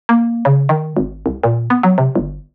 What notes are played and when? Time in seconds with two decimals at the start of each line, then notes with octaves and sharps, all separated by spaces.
0.09 A#3
0.45 C#3
0.69 D#3
0.97 G#1
1.26 C2
1.44 A#2
1.70 B3
1.83 F#3
1.98 C3
2.15 G1